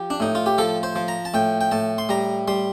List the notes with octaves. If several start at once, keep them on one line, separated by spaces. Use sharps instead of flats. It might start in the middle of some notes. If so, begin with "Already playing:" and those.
Already playing: F3 G4
D4
A2 D#4
F4
G4
F3 A4
C5
F3
A#5
A5
A2 G5
G5
A2 A5
C6
G3 A#5
G3 C6